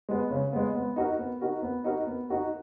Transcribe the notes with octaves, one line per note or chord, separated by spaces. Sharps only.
G#3 B3
C#3
G#3 B3
B3
D#4 F#4 A#4
B3
D#4 F#4 A#4
B3
D#4 F#4 A#4
B3
D#4 F#4 A#4